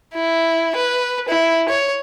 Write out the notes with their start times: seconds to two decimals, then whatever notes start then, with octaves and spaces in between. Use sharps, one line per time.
0.14 E4
0.76 B4
1.29 E4
1.69 C#5